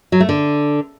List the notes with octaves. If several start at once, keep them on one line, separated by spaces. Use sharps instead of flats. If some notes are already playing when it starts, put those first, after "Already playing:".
F#3
A3
D3